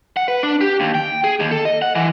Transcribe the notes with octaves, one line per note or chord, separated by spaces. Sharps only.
F#5
B4
D4
G4
D#2
G5
G#4
D#2
A4
D#5
F#5
E3